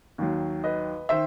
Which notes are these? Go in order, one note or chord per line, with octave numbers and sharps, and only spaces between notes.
D#2 D#3 F#3
B4 D#5
D#3 C5 E5